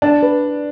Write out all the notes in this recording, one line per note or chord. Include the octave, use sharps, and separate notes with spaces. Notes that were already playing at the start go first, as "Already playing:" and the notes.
D4 A5
B4